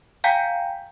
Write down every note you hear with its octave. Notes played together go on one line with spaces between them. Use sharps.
F5 G5 G#5 A#5 G6 B6